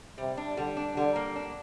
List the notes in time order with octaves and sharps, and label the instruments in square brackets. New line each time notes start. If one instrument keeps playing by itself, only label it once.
[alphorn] C3 [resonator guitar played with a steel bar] G3
[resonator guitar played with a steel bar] D4
[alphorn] D3 [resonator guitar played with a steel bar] G3
[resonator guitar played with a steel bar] D4
[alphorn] D3 [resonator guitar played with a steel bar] G3
[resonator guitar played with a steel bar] A#3
D4